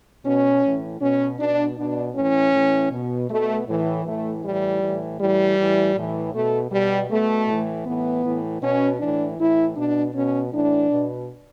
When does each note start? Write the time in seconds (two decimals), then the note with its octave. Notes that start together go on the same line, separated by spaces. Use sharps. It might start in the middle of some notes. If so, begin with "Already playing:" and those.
0.25 B2 C#4
0.63 A2 E3
1.01 B2 C#4
1.39 B2 D4
1.77 B2 D4
2.15 A2 E3 C#4
2.53 A2 E3
2.91 B2
3.29 B2 A3
3.67 A2 E3
4.06 A2 E3 A3
4.44 A2 E3 G3
4.82 A2 E3
5.19 A2 E3 G3
5.58 A2 E3
5.96 A2 E3
6.34 B2 A3
6.72 B2 G3
7.10 B2 A3
7.48 A2 E3
7.86 A2 E3 B3
8.24 A2 E3
8.62 B2 C#4
9.00 A2 E3 D4
9.38 A2 E3 E4
9.76 B2 D4
10.14 B2 C#4
10.52 A2 E3 D4
10.90 B2